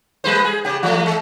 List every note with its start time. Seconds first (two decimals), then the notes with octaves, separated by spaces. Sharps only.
0.24 G3 B4 C5
0.44 G#4
0.65 C#3 G4
0.83 E3 G#3 A3
1.06 G#3